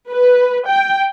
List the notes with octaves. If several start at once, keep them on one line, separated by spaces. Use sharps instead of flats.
B4
G5